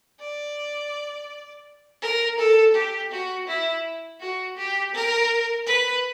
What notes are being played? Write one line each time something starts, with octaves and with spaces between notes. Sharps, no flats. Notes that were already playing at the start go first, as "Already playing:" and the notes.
D5
A#4
A4
G4
F#4
E4
F#4
G4
A#4
B4